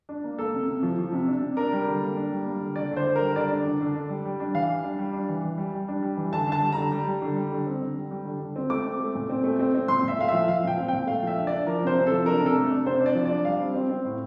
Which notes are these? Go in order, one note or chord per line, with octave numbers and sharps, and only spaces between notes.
D4
A#3
A#3 A4
C3
C3
F3
F3
C3
D4
C3
D4 A#4
G3
D3
A#3
D4
G3
A#3
D3
D3 D5
D3
C5
D3
A#4
G3
D3 D5
D4
D3
D3
D4
G3
G3
D4
E3 F5
G3
D4
G3
D4
E3
E3
G3
G3
D4
G3
E3
D3 A5
D3
A5
G3
D3 A#5
G3
G3
D3
G3
D3
C4
D3
G3
G3
D3
D3
C4
A3 D6
C4
A3
A#2
C4
A3
C4
C4
A#2 C6
A#2 E5
A3 F5
F3 E5
F3 F5
A#2 G5
C4
A#2 G5
A3 F5
F3
E5
D4
D4 D5
F3 A#4
C3 C5
C3
A4
F3
D4 A#4
C3
A4
A3
D4
C3 C5
D4
D5
F3
D5
D4
G3 F5
C4
C4
C4
A2